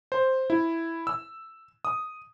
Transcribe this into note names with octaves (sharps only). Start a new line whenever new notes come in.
C5
E4
E6
D#6